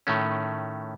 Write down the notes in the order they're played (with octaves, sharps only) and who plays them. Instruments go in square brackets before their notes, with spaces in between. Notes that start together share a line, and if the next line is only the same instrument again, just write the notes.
[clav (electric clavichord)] A2 D#3 A3 C#4